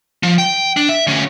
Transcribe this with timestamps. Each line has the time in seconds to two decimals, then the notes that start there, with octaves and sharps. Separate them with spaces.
0.23 F3
0.38 G5
0.77 D4
0.89 E5
1.07 D2 C#4